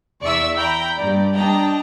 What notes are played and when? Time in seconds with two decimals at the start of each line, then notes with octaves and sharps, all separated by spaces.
0.22 E2 D5 E5 C#6 E6
0.58 G5 A#5 B5 G6
0.96 G2 D5
1.35 D4 D#5 G5 A5 A#5